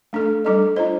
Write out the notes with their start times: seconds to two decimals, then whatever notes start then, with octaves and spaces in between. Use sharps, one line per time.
0.13 A3 D4 A4
0.44 G3 D4 A4 D#5
0.76 D4 F4 C5 D#5